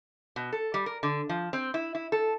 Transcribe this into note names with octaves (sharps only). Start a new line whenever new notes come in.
B2
A4
G3
A#4
D3
F3
C4
E4
E4
A4